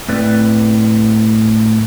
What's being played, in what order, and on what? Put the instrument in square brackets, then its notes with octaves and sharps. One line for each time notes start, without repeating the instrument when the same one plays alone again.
[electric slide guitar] A2 C4 B4 D5